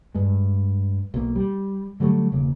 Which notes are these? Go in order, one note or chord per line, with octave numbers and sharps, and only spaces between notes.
G2 G#3
B1 A#3
G3
D3 F#3 G3 A3
E1 C#3 A#3